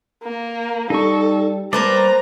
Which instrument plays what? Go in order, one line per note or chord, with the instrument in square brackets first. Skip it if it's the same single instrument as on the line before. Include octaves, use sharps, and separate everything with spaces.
[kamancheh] A#3
[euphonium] G3 [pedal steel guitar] D#4 C#6 [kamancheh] A4
[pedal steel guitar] G3 D5 A5 [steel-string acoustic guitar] A#3 B4 C5 [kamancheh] A#5